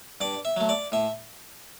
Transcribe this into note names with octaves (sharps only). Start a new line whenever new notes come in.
G2 D5
E5
F#3 A3
D5
A2 E5